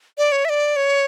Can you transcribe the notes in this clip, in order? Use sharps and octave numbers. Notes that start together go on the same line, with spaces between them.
D5
C#5
E5
D5
C#5